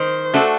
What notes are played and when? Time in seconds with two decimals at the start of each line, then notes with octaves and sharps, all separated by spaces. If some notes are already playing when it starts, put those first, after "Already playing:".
Already playing: D#3 C5
0.33 A3 D4 F#4 A4